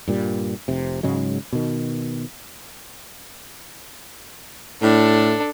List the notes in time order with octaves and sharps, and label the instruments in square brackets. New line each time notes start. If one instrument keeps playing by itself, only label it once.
[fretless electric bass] G2 A#2 G3
F1 C3
G#2 C#3 F#3 G#3
B2 D#3
[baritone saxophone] A2 [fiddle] D4 A4